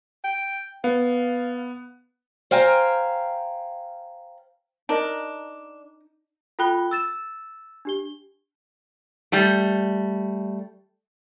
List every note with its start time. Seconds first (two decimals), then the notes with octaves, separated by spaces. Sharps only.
0.24 G5
0.84 B3 F5
2.51 C5 F5 G5 G#5 A#5
4.89 D4 D#4 A#4 D#5
6.59 F4 A4 G5 B5 F#6 G7
6.91 E6 A6 E7
7.85 D4 G4 G7
9.32 G3 A3